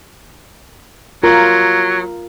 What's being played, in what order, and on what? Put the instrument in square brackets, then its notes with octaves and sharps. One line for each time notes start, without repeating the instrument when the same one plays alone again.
[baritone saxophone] F#3 [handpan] F4 A#4